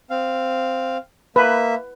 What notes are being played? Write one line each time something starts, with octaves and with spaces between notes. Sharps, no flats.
C4 F5
A#3 B4 E5